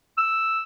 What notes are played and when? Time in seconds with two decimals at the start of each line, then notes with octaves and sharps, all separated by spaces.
0.18 E6